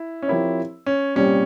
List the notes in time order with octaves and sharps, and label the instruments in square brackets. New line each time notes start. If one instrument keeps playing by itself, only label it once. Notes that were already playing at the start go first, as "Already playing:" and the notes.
Already playing: [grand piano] E4
C#4
[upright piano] F3 C4 G4 A#4 C#5 [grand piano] E4
[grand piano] C#4
[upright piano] C2 A#2 G3 C4 [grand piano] C#4